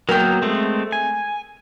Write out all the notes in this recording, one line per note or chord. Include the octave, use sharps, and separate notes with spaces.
F#3 A#3 B3 A#4 G5
G#3 A3 C4
G#5